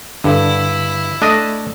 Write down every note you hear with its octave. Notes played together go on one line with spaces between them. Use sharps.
G2 D3 E4
A3 D4 D#5